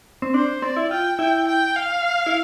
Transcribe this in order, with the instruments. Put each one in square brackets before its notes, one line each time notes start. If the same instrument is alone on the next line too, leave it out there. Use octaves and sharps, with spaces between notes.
[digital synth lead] C4
[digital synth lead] D4 [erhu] C5
[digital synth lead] C4 [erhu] D5
[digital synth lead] E4
[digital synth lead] F4 [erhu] G5
[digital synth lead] E4 [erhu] G5
[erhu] G5
F5
[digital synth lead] E4